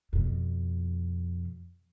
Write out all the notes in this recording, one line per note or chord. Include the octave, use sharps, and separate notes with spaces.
F2 B2